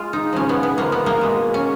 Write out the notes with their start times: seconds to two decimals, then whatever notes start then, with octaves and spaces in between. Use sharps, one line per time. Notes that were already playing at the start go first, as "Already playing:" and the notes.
Already playing: G#3 F4
0.13 D#4
0.33 C#3 F3 G#3 C#4
0.49 B3
0.63 B3
0.77 C#3 F3 G#3 A#3
0.92 B3
1.06 A#3
1.21 B2 G#3
1.54 C#4